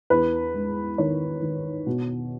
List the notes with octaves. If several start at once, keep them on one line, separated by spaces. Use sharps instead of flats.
E2 B4
G#3
D#3 C#5
D#3
B2